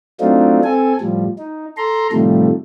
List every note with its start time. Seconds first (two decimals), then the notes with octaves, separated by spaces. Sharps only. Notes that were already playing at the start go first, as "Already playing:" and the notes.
0.20 F#3 A3 C4 D4 D#4 F4
0.64 C4 A4 G#5
1.01 A2 F3 G3
1.38 D#4
1.77 A4 A#5 C6
2.12 A2 C3 D#3 F3 G3 A3